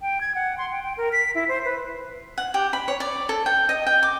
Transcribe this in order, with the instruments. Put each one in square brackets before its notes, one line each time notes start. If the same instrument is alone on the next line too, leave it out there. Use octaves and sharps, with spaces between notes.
[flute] G5
G#6
F#5
C6
G5
G5
A#4
B6
E4
C5
B4
[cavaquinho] F#5
G4
B5
C#5
D5
A4
G5
D#5
G5
D6